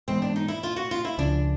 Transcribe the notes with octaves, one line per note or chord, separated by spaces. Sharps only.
G#2 E3 G#3 B3 C4
D4
D#4
E4
F4
F#4
F4
E4
C#2 C#3 F3 D4